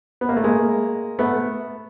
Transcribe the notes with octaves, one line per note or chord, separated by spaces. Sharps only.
B3
A#3
A3
G#3 A#3
A3 B3